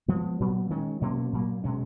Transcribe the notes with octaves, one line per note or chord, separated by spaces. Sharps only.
F3 G#3 B3
A#2 F#3 B3
D#3 G#3 C#4
B2 F#3 A#3 C#4
A#2 F#3 A#3
B2 G#3 C#4